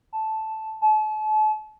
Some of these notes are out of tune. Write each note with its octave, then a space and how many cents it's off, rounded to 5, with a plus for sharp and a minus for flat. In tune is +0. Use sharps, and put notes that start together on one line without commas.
A5 -5
A5 -40